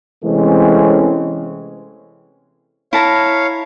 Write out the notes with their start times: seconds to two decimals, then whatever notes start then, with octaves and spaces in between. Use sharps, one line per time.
0.25 C3 E3 G#3 A3 C4 C#4
2.93 E4 C#5 F5 A5 A#5